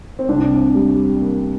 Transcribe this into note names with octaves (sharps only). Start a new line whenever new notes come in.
C4
C2 D4
G3
A#3